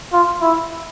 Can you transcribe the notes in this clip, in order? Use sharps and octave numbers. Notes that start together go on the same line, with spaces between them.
F4
E4